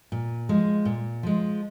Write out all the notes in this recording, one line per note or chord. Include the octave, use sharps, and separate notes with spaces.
A#2
F3 G#3
A#2
F3 G#3